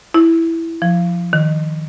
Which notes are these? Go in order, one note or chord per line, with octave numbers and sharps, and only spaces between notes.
E4
F3
D#3